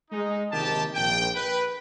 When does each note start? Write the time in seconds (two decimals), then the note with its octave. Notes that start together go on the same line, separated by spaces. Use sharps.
0.11 G#3 D#4
0.52 A#1 D#2 C3 D#3 G4 A5
0.95 A#1 G5
1.36 B4